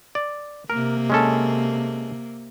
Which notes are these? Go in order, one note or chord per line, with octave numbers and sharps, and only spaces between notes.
D5
C3 A#3 A#4
G#3 C#4 A4